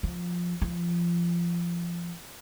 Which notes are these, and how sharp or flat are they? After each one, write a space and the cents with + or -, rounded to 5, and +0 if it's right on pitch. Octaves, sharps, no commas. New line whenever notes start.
F3 +10
F3 -20